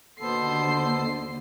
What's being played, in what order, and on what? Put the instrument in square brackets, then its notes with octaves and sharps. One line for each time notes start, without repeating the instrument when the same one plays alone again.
[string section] D#2 D3 [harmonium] B2 B3 A4 [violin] C5 C7